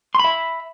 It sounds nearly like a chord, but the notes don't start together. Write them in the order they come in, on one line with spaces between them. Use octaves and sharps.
C6 B5 E5